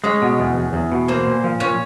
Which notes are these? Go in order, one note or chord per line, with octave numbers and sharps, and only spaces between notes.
G#3 C#4 C#5
B2
E2
E2
E2
B2
A#3 C4 C5
A#2
F3
A#2 C#4 C#5